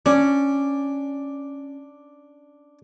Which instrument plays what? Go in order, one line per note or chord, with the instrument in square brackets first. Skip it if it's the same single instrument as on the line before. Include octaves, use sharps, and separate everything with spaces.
[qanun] C#4 [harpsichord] D4